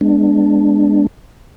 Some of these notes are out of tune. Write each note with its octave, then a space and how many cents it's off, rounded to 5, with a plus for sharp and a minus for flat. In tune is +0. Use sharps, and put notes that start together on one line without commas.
G#3 +0 B3 +0 D4 +0